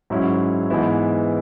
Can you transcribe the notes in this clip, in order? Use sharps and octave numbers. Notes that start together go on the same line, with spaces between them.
G#2 F#3 C#4 E4
G#2 E3 B3 E4